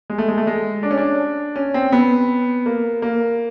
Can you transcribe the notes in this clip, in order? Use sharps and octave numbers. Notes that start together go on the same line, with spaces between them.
G#3
A3
G#3
A3
G#3
D4
C#4
D4
C#4
C4
B3
A#3
A#3